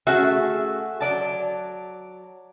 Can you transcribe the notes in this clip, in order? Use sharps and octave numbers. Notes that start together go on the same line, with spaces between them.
A3 C#4 F#4 G#4 E5
F#3 D5 A5